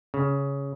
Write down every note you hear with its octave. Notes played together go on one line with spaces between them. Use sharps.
C#3